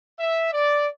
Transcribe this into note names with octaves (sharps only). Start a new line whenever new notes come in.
E5
D5